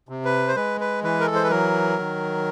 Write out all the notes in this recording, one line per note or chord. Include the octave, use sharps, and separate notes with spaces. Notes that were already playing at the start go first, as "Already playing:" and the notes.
C3
B4
C5
G#3 B4
B4
E3 B4
A#4
A4
C5
B4
F#3 A#4
D#3